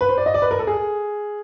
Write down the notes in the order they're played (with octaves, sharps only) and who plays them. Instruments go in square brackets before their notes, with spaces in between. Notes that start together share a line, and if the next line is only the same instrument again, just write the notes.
[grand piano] B4
C5
D5
D#5
D5
B4
A#4
A4
G#4